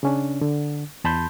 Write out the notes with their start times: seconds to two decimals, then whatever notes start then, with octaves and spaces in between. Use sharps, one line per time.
0.03 C#3 C#4 D4
0.41 D3
1.04 E2 A5 B5 C6 G6